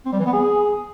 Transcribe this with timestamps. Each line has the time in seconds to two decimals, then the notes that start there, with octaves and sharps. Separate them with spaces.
0.05 C4
0.12 G3
0.19 E3
0.26 B3
0.33 G#4